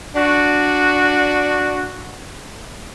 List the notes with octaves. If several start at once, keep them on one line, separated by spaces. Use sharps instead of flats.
D4 F#4